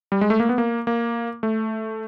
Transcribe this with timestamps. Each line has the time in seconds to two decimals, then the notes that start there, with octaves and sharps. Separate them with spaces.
0.12 G3
0.21 G#3
0.30 A3
0.40 A#3
0.49 B3
0.58 A#3
0.87 A#3
1.43 A3